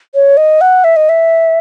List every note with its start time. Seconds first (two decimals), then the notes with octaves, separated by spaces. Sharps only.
0.15 C#5
0.37 D#5
0.61 F#5
0.84 E5
0.96 D#5
1.09 E5